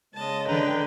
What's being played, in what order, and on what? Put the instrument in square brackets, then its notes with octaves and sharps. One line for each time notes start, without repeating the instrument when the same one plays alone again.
[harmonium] C#3 G#3 [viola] D#5 A5
[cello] D3 [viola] B4 G5 [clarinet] A#5